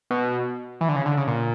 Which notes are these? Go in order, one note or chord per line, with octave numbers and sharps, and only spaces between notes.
B2
E3
D3
C#3
D3
C#3
A#2